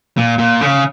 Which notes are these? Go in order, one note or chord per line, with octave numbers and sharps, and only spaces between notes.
A#2
A#2
C#3